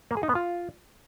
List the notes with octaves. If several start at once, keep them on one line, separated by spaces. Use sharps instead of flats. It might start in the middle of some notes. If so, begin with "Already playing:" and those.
A#3
G#4
D#4
B3
F4